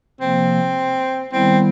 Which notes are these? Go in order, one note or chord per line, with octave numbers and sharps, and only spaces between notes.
C3 F3 A#3 C4
D#3 G3 B3 C4 E4